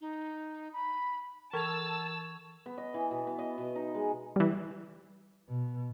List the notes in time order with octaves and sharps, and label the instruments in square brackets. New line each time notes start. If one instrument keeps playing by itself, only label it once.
[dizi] D#4
B5
[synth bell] E3 [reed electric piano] A#4 [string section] A5 E6 [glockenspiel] C#6 G#6 F7
[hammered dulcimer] B3
D#5
E3
B2
B3
D#5
B2
D#4
G#3
[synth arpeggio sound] E3 G3
[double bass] B2